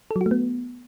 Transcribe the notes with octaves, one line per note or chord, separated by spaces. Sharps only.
A4
F#3
F#4
A3
B3